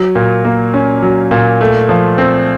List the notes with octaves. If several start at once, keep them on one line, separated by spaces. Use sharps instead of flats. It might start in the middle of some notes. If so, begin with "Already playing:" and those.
Already playing: F#3
A#2
A#3
C#4
F#3
A#2
A3
F3
C4